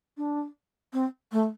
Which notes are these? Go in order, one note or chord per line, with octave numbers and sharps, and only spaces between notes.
D4
C4
A3